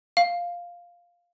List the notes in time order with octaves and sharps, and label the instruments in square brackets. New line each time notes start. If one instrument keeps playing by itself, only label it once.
[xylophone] F5